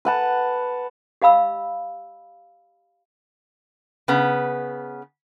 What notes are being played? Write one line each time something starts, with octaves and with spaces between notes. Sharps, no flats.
B4 F#5 A5
G4 D#5 F5 B5 E6
C#3 B3